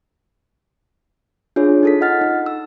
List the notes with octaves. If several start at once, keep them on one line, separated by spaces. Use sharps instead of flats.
D4 F4 G#4 C#5
D#4 A4 B6
F4 D#5 F#5 F6 A6
D#4
E6